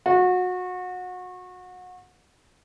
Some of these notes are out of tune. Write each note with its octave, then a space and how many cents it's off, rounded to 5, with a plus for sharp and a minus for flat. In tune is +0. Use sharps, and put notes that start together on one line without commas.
F#4 -30